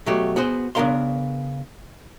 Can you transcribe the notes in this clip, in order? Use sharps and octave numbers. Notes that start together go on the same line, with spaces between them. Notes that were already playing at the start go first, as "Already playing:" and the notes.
B2 F#3 A3 G4
B3 F#4 G#4 C5
C#3 B3 D4 A#4 F5 C6